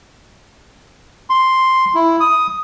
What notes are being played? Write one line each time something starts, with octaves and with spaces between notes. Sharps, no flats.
C6
E4
D#6